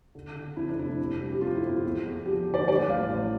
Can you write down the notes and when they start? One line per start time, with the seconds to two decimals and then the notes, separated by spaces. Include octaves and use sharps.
0.15 D3
0.36 D3
0.56 F2 E4
0.69 D4
0.77 F1 E4
0.99 C3
1.20 G3
1.31 G4
1.41 F2 F4
1.55 E4
1.62 G1
1.69 F4
1.83 E2
2.05 E2
2.25 F3 G4
2.46 D3
2.54 D5
2.68 G3 D5
2.88 A1 F5
3.10 A1